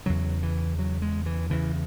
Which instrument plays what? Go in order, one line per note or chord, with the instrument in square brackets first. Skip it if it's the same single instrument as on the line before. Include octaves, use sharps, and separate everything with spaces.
[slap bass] E2 C#3 F#3
E3
F#3
G#3
E3
E2 C#3 E3